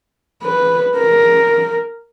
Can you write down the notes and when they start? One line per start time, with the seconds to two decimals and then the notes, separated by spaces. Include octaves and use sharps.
0.43 B4
0.97 A#4